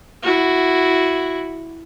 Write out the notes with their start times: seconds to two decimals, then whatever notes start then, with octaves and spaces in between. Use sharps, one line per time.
0.23 E4 F#4